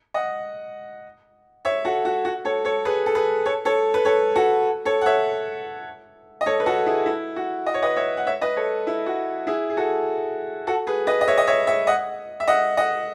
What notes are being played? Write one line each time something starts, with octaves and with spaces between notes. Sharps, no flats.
D#5 F#5
C#5 E5
F#4 A4
F#4
F#4
A4 C#5
A4 C#5
G#4 B4
A4
G#4 B4
A4 C#5
A4 C#5
B4
A4 C#5
F#4 A4
A4 C#5
F#5
C#5 E5
D#5
A4 C#5
B4
F#4 A4
E4 G#4
E4
F#4
D#5
C#5
B4 D#5
C#5 E5
F#5
C#5 E5
B4 D#5
A4 C#5
E4
F#4
E4 G#4
G#4
F#4 A4
F#4 A4
G#4 B4
B4 D#5
D#5
C#5 E5
D#5
C#5 E5
C#5 E5
D#5 F#5
E5
D#5 F#5
D#5 F#5